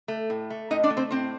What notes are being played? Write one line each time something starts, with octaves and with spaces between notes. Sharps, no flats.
A3
A2
A3
A2 D#4 D#5
D4 D5
A3
C4 C5
A2 C4 C5